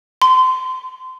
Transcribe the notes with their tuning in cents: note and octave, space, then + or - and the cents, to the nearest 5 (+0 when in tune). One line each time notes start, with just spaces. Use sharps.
C6 -25